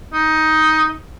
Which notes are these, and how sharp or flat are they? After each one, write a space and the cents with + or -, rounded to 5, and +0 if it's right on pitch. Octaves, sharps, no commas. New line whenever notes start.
D#4 +10